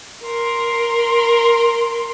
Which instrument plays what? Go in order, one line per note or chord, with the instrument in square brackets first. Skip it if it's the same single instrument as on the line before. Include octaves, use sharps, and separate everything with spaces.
[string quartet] A#4 C6